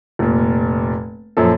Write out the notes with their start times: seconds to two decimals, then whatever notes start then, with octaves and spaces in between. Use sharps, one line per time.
0.19 F1 A#2
1.37 F#2 A#2 F3 A4